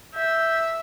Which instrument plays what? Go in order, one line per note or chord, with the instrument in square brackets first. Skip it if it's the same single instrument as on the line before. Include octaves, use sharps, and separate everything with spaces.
[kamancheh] E5 [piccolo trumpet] G6